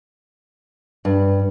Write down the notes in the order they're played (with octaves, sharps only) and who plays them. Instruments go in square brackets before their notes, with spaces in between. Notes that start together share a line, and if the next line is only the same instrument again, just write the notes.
[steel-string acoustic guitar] G2